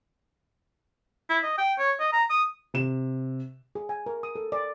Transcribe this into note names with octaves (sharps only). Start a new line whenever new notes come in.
E4
D#5
G5
C#5
D#5
A#5
D#6
C3 E7
G#4
G#5
A#4
D#6
A4
D5